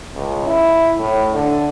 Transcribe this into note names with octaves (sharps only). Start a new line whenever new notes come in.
C#2
E4
A2
D3